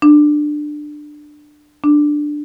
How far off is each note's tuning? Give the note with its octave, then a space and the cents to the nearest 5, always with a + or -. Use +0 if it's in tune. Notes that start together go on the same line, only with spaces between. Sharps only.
D4 +20
D4 +10